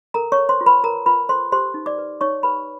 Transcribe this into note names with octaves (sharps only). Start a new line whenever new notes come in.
A4 A#4 A#5
C#5 C#6
A4
C5 C6
F4
B4 B5
F4 A#4 A#5
F4 B4 B5
A4 C5 C6
G4 C5 C6
D#4
D5 D6
B4
D#4 C#5 C#6
G4 B4 B5